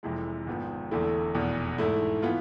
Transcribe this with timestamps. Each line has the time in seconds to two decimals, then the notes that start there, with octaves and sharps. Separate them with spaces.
0.03 F1 F2 C3 E3 G#3
0.47 G#1 G#2 F3 B3
0.91 E1 E2 D3 A3 E4
1.35 F1 E2 B2
1.78 G#2 E3 A3 E4
2.22 E3 B3 F4